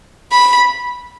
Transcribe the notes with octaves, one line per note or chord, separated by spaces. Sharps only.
B5